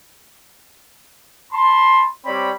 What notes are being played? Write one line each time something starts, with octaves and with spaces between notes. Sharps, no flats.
A5 B5 C6
G3 C4 C#5 D5 B5